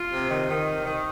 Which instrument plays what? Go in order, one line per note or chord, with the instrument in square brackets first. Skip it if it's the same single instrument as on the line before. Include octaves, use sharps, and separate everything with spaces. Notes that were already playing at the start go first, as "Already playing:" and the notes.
Already playing: [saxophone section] F4
C3
D#3
D#3
C3
D#3